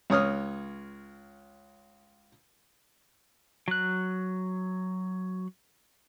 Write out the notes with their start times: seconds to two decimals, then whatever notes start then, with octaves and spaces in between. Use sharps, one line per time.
0.10 C#2 C#5 D#6 F6
3.68 F#3 F#6